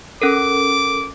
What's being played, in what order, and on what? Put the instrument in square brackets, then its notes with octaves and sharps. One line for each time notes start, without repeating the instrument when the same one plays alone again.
[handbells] C#4 A4 A#4 [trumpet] D6